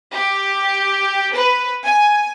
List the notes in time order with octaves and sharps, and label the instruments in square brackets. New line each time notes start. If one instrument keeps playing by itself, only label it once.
[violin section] G4
B4
G#5